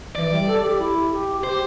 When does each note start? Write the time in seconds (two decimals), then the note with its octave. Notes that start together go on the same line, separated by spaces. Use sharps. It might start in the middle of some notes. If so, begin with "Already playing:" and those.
0.15 E3 D5
0.32 G3
0.47 A4
0.63 G4
0.79 E4
1.11 G4
1.43 G4 C5